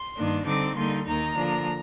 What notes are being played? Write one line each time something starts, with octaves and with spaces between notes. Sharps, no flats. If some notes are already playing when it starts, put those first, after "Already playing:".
Already playing: C6
G2 D#3 A#3 D4
D3 G3 C4 D#4 D6
D3 G3 A#3 D#4 C6
D#2 D#3 A#3 D#4 A#5
D3 F3 A#3 D4